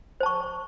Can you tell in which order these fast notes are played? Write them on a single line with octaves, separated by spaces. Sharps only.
C5 A5 C#6